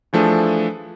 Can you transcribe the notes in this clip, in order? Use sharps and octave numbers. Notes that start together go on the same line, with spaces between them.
E3 F3 A3 D4 G#4 A4